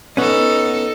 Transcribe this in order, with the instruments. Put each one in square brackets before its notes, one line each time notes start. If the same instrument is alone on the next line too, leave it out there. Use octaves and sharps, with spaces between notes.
[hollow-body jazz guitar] B3 C#4 [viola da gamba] D#4 A4